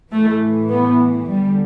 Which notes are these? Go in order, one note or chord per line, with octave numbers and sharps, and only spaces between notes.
A2 E3 A3
B3
E2 D3 G3